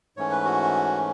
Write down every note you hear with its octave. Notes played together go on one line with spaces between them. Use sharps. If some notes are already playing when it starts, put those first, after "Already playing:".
G#2 E3 A3 C#4 C#5
B4
F#4